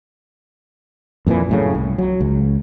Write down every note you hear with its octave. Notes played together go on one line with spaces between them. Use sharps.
F2 A#2 D3 E3
F#2 A2 C#3
C2
F#3
C#2